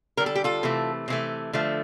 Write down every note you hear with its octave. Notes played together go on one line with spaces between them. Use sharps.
D3 G3 A#4
A4
G4
F4 A4
C3 E3 A3
C3 E3 A3
D3 F3 A3